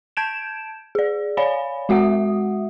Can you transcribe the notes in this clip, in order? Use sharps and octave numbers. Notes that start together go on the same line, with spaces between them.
A5 G6 G#6 D7 E7
G#4 D5
C#5 D5 F5 G#5 B5
G#3 F#4 E5 F#5 D#6